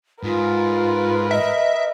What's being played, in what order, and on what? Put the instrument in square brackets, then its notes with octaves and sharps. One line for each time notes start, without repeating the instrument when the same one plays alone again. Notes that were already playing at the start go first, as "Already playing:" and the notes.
[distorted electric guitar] G#2 [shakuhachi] F4 [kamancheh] A#4 B4
[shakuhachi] D#5 [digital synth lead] E5